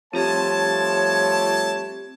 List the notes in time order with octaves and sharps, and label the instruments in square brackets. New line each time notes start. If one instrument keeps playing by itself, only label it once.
[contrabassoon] F3 [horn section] G3 A3 A5 [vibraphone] C4 G4 [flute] C#5